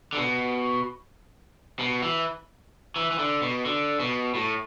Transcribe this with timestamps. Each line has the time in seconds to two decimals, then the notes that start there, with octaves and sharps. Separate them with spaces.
0.13 D3
0.17 B2
1.79 B2
2.03 E3
2.96 E3
3.11 E3
3.19 D3
3.42 B2
3.65 D3
4.00 B2
4.35 A2